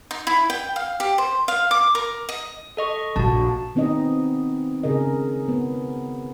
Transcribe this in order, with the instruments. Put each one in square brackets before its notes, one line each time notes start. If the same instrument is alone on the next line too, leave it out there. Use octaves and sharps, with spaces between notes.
[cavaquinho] D#4
E4
G5
F5
G4
C5
F5
D6
A#4
D#5
[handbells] A4 D#5 C#6
[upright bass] A#1 [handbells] F#4 A5
[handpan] D#3 B3 C4 D#4 D#5
C#3 G#4 A#4 D#5
B3